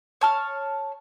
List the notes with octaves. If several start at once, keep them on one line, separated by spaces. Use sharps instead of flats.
C#5 A5 F6